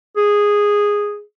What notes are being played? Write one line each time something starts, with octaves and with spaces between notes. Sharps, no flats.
G#4